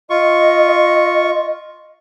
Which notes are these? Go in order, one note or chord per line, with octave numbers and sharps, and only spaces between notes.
F4 D#5 C#6